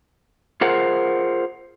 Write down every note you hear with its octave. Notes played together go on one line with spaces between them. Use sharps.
F4 G#4 A#4 C5 F#5